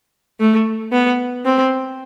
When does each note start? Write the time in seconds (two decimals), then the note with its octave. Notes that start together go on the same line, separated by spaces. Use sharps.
0.40 A3
0.92 B3
1.45 C4